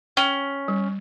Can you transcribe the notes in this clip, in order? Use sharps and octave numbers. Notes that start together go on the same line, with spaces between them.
C#4 G5
G3